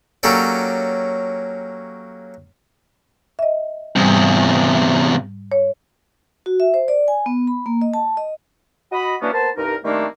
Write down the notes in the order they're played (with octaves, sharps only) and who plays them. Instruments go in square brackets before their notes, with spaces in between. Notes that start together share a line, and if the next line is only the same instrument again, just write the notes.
[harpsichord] F#3 A#3 C#4 G4 A4 D5
[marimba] D#5 E5
[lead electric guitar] E2 C3 [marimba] G#2 G3
[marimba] C#5
[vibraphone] F#4
E5
C5
D5
G#5
B3
B5
A#3
D#5
A5
D#5
[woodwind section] F#4 D#5 B5
E3 F#3 A#3 B3 C#4 D4
A#3 B3 C5 A5
C2 G2 D#4 A#4
D#3 G3 A3 A#3 C4 D4